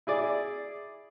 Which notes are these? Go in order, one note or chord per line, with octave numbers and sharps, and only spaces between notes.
E4 G#4 D5